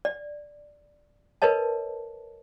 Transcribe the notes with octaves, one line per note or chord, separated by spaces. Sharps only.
D5
A#4 B4 C#5 D#5 A5